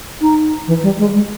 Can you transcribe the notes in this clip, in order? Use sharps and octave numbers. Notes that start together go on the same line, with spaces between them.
D#4
E3
G3
G#3
G#3